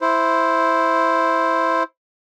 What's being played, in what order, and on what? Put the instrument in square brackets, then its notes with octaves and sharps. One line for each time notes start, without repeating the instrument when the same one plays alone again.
[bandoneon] E4 C5